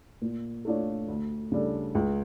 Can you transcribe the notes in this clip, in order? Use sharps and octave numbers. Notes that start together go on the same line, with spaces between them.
A#2
A3 D4 F4 C#5
D2
C#3 G3 D4 A4
C#2